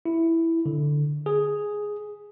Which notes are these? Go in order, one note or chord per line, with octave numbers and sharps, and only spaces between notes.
E4
D3
G#4